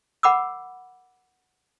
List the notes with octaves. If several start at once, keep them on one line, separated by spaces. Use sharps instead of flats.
A#4 F#5 B5 D6 E6